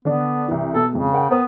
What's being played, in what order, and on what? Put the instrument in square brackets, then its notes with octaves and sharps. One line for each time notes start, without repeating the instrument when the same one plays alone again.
[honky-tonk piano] D3 D4 [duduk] B3
[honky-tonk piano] C2 E3
[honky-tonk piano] B2 [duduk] A4
[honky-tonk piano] F2 G#3 [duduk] C#3
[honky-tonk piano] A#4 F#5 G5
[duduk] B3 [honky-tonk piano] A#4 C5 D#6